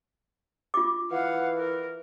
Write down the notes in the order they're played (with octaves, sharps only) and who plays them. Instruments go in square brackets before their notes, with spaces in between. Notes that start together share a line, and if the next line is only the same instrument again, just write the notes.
[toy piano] F4 D6
[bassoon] E3 [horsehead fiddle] F5 F#5
[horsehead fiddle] A#4